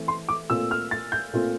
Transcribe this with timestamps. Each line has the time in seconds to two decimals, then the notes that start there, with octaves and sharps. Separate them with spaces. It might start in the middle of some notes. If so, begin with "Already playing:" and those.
Already playing: E3 A3 C4
0.08 C6
0.29 D6
0.50 A#2 A3 C4 F4 E6
0.71 F6
0.91 A6
1.12 G6
1.33 A#2 A3 C4 F4